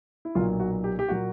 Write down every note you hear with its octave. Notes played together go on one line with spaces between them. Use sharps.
E4
B1 A#2 F#3 A#3 F4
F#4
G4
G4
A#2 F#3 A#3 F#4